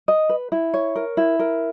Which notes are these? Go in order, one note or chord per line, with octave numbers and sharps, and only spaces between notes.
D#5
B4
E4
C#5
A#4
E4
A#4